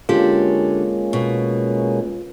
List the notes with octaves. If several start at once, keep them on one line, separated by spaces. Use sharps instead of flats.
D3 G#3 A#3 C#4 F4 G4
B2